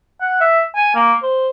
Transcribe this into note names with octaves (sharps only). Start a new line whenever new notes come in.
F#5
E5
G#5
A#3
C5